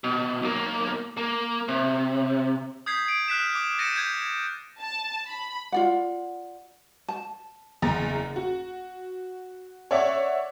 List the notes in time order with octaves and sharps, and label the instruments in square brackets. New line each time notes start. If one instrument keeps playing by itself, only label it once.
[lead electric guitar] B2
B1 A#3
A#3
C3
[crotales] D#6 G6 G#6 B6 C7
G#6 D7
F6 F#6 B6 E7
D6
G6 A6 A#6 C#7 D#7 E7
G6 G#6
[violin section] A5
B5
[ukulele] F4 D5 F#5
A5
[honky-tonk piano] F#1 E2 A#5 A6
F#4
C#5 D5 E5 F#5 D6